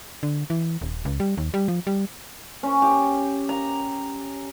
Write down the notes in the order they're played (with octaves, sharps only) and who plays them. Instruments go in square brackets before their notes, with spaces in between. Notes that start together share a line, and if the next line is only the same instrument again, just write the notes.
[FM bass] D3
E3
D#1
C#2
G3
D#2
G3
F3
G3
[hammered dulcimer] C#4
G4
A#5